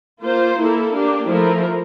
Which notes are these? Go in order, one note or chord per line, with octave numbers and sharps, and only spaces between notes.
A#3 F4 C5
A#3 E4 A4
A#3 D4 G4
F3 A3 E4 A#4